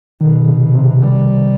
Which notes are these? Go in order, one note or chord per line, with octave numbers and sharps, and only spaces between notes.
B2 D#3
C3
C3
G3